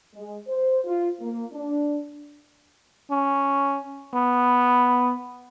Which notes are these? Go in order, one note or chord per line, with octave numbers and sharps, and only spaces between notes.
G#3
C5
F4
A#3
D4
C#4
B3